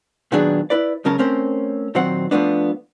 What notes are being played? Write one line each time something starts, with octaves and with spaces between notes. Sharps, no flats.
A#2 D#3 F#3 B3 D4 G#4
E4 B4 D5
C#2 F#2 C#3 C#4 A#4 A5
A3 C4 C#4 A#4 C5
A#2 D#3 F#3 C4 C5 F#5
F3 F#3 A3 B3 D4